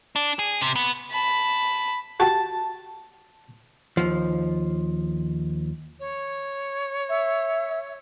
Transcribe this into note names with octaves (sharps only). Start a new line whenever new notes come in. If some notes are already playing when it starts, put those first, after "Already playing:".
D4
G#4
C3
B3
A5 B5
F#4 G4 A5
D#2 F3
C#5
E5